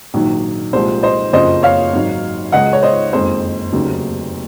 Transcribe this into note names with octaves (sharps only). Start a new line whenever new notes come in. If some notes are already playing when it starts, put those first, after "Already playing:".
A#1 G#2 D#3 F#3
C2 A#2 F3 G#3 C5
C5 D#5
F#1 F2 C#3 F3 C5 D#5
C#5 F5
G#1 G#2 F#3
C#2 C#3 G#3 D#5 F#5
C#5
C5 D#5
F#1 F2 D#3 G#3 C5
F1 D#2 C#3 F#3